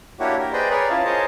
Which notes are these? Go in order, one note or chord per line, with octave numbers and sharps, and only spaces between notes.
A#3 D4 E4 F#4 G4 C#5
G4 A#4
G#4 B4 C5 D5 D#5 G5
G#4 A#4 B4 C#5 D5
C#4 E4 F4 F5 A5
G#4 A#4 C5 C#5 D#5 A5